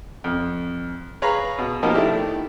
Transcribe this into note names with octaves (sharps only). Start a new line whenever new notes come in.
F2
G#4 B4 C#5 F5 A#5 B5
B2
B2 F3 A#3 D#4 G4
D#3 A3 D4 E4 G4